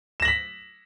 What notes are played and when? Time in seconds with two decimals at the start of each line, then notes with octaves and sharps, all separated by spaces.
0.20 E7
0.22 A#6
0.25 F#7
0.28 B6